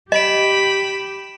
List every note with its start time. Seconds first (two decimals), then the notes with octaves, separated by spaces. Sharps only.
0.12 G4 D#5 B5 D7 E7